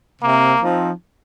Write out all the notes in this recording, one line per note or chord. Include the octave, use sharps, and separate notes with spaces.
C3 A#3
F3 C4 D#4